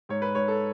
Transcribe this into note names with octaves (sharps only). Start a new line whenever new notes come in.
G#2 C#5
B4
G#2 C#5
A4